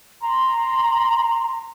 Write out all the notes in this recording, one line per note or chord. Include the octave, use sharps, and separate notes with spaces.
A#5 C6